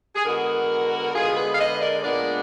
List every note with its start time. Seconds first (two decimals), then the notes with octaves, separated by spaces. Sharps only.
0.15 G#4
0.25 D3 G#3 B3 F#4 A#4
1.14 D3 G#3 B3 F4 G#4
1.37 G#4 B4
1.53 F5
1.59 B4 D#5
1.81 A#4 D5
2.03 A#2 G#3 B3 D4 A#4 D5